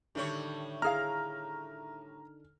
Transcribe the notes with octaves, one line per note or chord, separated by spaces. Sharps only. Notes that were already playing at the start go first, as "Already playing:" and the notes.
A2 D3 D#3 G3 A4 C#5
E4 G#4 F5 A#5 F6